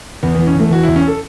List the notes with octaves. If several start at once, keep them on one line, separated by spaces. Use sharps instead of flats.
E2 B3
B3
E3
C#4
E2 A3
E3 F#4
E4
E2
C#4
A4